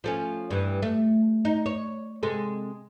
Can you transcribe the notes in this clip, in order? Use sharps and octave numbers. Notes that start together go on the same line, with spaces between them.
F3 A3 C#4
G2 E3
A3
D#4
C#5
C3 G#3 A4